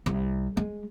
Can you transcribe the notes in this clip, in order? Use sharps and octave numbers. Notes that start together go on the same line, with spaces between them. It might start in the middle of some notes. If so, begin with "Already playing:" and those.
C2
G#3